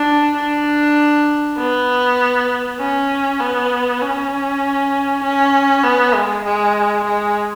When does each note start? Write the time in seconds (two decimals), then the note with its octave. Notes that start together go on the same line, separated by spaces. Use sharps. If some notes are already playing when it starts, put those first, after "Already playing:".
Already playing: D4
0.37 D4
1.59 B3
2.80 C#4
3.40 B3
4.01 C#4
5.23 C#4
5.84 B3
6.14 G#3
6.44 G#3
7.04 G#3